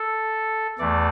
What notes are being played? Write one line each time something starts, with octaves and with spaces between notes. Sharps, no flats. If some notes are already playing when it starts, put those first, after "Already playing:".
Already playing: A4
E2 E3 A3 D5